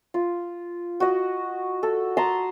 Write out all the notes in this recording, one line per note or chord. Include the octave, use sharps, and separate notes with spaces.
F4
F#4 D#5
A4
A5 A#5 C6 D#6